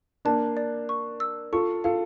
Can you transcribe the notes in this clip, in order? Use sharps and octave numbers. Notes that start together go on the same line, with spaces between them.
A#3 D4 A5
D5
C#6
E6
F4 A4 C#6
F4 A4 F5